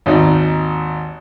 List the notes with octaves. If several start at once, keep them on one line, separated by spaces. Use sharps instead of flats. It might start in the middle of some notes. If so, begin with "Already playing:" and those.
G#1 D#2 D#4 D5